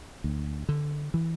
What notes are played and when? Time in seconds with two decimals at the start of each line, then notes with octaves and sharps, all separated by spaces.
0.24 D2
0.69 D3
1.14 E3